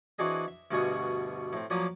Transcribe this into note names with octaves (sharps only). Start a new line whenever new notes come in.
E3 C4 D4 F#4 G#4 D#5
E5
D2 G2 B2 F#4 G#5 D#6
A2 C4
F3 F#3 A#3 D5 D#6